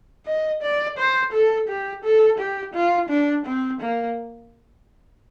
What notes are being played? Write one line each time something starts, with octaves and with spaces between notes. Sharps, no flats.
D#5
D5
C5
A4
G4
A4
G4
F4
D4
C4
A#3